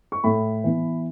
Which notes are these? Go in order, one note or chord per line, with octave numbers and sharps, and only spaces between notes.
C#6
A2 B5
E3 B3